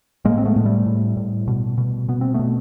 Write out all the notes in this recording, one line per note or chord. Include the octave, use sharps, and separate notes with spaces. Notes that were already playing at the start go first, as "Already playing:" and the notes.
A2 G#3 A#3
C4
A3 B3
A2
G3 A3
A2
A2
B2
B2
B2 B3
C4
B2 A3 B3